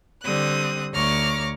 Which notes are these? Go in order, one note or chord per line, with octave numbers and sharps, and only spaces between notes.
D3 G3 C4 D#6 F#6
D2 C#5 A#5 C#6 D6 F6